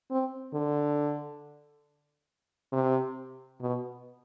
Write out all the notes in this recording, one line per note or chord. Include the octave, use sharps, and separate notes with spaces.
C4
D3
C3
B2